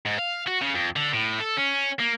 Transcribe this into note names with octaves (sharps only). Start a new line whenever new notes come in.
G#2
F5
F#4
C#3
F2
D3
A2
A4
C#4
A#3